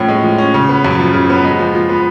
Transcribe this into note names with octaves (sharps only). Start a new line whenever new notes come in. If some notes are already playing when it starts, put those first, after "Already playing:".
Already playing: A2 F3 C#4
G#3
F3
C#4
C#3
B3
F#2
F3
C#3
B3
G#3
F3
F3
B3